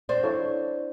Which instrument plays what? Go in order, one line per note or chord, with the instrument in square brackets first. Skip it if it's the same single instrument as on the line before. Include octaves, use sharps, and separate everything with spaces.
[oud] C4 D4
[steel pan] E4 A4 C#5 F5